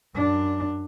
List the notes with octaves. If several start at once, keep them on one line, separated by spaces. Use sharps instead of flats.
F#2 D4